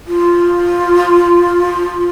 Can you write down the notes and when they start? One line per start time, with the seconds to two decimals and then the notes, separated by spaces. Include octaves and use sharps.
0.08 F4